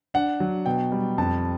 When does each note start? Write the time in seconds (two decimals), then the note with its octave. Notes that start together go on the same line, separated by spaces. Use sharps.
0.14 D4 F#5
0.40 F#3
0.66 B2 G5
0.92 G3
1.18 F2 A5